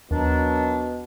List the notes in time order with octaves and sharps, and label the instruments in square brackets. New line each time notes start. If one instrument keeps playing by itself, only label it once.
[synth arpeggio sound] D#2 [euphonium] B2 [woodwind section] D#3 F#3 D4